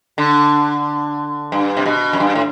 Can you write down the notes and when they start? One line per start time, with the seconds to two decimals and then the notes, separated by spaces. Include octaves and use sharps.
0.18 D3
1.52 G2
1.77 C3
1.86 B2
2.13 F#2
2.20 G2
2.35 A2